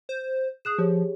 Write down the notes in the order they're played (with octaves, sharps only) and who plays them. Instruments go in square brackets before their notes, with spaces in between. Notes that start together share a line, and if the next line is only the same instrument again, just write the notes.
[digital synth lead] C5
[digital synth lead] G#4 [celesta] D#6 F#6 E7
[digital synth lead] F3 [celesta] G4 G#4 C#5